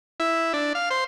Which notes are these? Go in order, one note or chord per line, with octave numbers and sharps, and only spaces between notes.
E4
D4
F5
C5